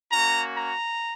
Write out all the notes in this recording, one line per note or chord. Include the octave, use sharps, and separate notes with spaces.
A#3 C#4 F#4 A#5
A#5